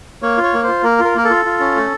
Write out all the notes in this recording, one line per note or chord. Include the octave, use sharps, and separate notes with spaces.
A#3 C#5
F4
C#5
A#3
F4 C5
A#3 A#4
F4
A#4
A#3 A#4
A4
F4
F4
C#4
A3